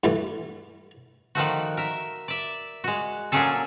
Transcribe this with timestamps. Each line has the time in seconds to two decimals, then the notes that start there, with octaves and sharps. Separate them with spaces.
0.04 G2 E3 A3
1.35 D#3 F3 A3 F#4
1.77 A#4 E5
2.28 D5 E5
2.84 G#3 F#4
3.32 A#2 F#3 C#4 D4 G#4 A4